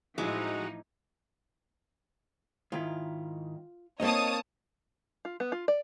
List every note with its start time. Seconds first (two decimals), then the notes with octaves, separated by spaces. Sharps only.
0.18 A1 F3 G#3 D#4 E4 F#4 B5 D6
2.72 G#2 D#3 E4 F4
4.00 A#3 C4 D#4 C#5 D#5 A5 D#6
5.25 F4
5.40 B3
5.52 F4
5.68 D5